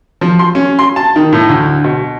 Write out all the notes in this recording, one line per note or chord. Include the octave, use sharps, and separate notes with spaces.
F3
C6
C#4
C6
A5
D#3
A2
D2
B2